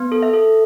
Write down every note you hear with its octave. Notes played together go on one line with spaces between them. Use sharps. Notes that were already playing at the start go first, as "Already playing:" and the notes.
Already playing: B3
A4
E5
A4